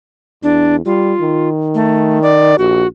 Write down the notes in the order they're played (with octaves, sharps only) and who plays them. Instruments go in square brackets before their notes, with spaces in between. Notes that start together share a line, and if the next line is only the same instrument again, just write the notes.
[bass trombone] E2 [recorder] D4
[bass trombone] G3 [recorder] F4
[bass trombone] D#3
[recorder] A3
D5
[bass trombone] A#1 [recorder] F#4